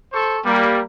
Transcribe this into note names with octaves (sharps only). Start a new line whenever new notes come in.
A4 C5 C#6
G3 A#3